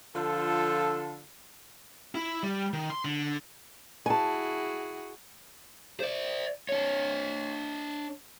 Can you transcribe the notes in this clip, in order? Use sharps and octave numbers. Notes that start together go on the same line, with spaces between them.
D3 F3 F4 A4
E4
G3
D#3
C6
D3
E4 F#4 G#4 G#5 A5
C5 D5
D4 C#5